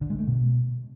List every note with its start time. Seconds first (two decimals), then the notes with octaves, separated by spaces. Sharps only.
0.01 D3
0.10 G#3
0.19 A3
0.27 B2